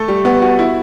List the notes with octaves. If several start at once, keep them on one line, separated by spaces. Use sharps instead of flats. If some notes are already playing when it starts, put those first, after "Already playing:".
Already playing: A3 A4
G3
B3
F#4
E4